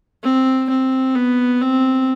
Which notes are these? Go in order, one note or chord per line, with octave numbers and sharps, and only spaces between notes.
C4
C4
B3
C4